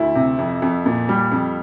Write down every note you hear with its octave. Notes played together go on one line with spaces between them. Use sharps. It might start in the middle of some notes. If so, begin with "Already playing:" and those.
Already playing: D2 E4
C3
F2
F2
A#2
G3
F2